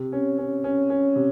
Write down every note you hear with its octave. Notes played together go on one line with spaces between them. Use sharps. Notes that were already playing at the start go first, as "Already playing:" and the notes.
Already playing: C3
C#4
C#4
C#4
C#4
C3